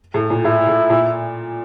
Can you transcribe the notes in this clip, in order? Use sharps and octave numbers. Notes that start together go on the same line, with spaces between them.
A2
A#2
A2 E4
A2
A#2